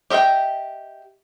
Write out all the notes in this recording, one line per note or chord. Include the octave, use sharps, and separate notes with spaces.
G4 D#5 E5 F#5 G5